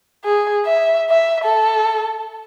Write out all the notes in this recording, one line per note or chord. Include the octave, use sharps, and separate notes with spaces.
G#4
E5
E5
A4